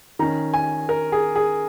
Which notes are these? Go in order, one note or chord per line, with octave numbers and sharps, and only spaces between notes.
D#3 C#4 A#5
G#5
A#4
G#4
G#4